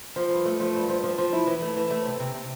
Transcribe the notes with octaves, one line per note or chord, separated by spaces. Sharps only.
F3
G2
A3
F3
G2
F3
F3
F3
E4
E3
A3
E3
A3
C3
C3
C3